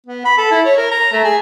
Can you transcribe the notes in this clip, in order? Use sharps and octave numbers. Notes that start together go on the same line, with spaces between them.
B3
B5
A4
E4
C#5
A#4
A#5
A3
G#4